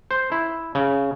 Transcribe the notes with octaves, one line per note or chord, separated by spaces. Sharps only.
C5
E4
C#3